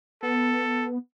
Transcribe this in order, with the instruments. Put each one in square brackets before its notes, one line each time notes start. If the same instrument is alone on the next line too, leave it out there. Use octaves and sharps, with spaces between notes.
[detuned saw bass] B3 [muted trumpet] A4